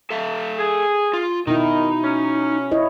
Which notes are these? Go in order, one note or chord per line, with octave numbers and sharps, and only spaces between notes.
A4 E5 F5
G#4
F4
B2 D#3 D#4 E4
C#4
E4 C#5 D#5